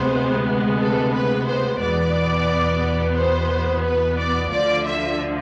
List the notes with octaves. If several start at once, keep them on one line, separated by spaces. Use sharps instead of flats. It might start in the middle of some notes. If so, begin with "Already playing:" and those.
Already playing: D2 C3 G#3 B3 C5
A4
B4
C5
E2 B2 B3 D5
C5
B4
D5
D2 D3 F3 D5
E5